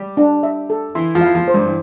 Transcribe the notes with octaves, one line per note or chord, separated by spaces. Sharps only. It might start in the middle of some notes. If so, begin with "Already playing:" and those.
Already playing: G3 G4
D4
E5
A4
E3 E4 C6
F3 F4
E4 F5
F3 F4
C5
G2 G3
E3